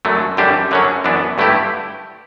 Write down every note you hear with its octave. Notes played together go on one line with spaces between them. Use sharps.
F#2 D3 F#3 A3
F#2 D3 G3 D4 G4
F#2 D3 F#3 C#4
F#2 E3 B3 D4
G2 D3 A3 E4 G4